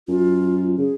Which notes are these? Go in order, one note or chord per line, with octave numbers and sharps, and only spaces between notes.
F#2 F4
C#3 G#4